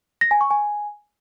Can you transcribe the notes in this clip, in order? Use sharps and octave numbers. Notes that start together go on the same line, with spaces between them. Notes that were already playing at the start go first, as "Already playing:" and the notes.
A#6
G#5
C#6
G#5